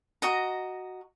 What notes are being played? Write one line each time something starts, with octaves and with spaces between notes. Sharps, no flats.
F#4 D#5 A#5